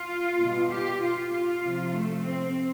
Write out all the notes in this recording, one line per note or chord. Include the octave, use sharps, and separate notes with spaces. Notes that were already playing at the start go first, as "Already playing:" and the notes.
Already playing: F4
B2 G3
G4
F4
F4
C3 F3
A3
C4